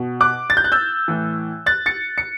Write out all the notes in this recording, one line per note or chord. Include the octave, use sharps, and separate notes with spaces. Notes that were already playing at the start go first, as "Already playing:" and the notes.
Already playing: B2
D6 F#6
A6
G6
F#6
E6 G6
A2 E3
F#6 A6
A6 C#7
C#7